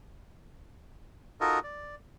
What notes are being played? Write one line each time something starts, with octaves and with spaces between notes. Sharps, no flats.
D#4 F4 F#4 A4 A#4 D#5
D5